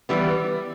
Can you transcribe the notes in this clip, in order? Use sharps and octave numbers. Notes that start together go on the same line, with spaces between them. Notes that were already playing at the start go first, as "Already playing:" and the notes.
E3 G3 B3